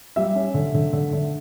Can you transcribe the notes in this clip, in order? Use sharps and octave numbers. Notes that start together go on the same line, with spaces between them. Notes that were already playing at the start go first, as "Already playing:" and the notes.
G3 E5
C#4
D3
D3
D3
D3